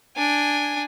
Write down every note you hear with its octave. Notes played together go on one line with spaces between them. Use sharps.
D4 G#5